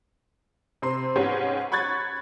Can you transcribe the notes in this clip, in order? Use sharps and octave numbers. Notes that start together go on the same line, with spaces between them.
C3 C4 C6
G#2 G#3 B3 C#4 G4
B5 C#6 F#6 G#6 A6